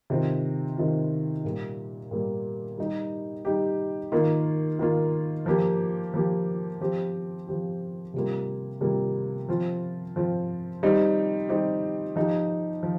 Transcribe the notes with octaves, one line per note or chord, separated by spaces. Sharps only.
C3 D#3 C4 F4
C3 D#3 C4 F4
A#2 G3 A#3
A#2 G3 A#3
G3 D#4 G4
G3 D#4 G4
D#3 A#3 F4
D#3 A#3 F4
F3 A#3 G4
F3 A#3 G4
F3 C4 G4
F3 C4 G4
C3 G3 A#3 F4
C3 G3 A#3 F4
F3 C4 F4
F3 C4 F4
G3 C4 D#4 G4
G3 C4 D#4 G4
F3 D#4 G4
F3